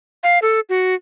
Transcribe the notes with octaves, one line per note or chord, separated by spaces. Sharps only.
F5
A4
F#4